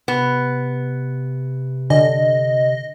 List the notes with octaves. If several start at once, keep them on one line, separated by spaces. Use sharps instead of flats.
C3 B3
D3 D#5